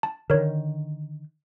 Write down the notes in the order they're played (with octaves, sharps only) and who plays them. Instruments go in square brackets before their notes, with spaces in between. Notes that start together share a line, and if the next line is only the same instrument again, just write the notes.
[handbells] A5
[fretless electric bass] D3 D#3 [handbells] A#4 C#5